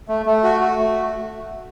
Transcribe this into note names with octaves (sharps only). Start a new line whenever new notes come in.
A3
A3
F#4
F#4
A3